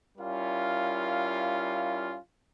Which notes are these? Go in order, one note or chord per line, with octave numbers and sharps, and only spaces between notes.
G3 C#4 E4 F4 A#4 F5